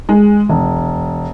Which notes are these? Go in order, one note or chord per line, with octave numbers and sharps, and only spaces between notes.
G#3
E1